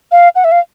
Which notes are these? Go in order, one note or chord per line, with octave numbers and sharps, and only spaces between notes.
F5
F#5
E5
F5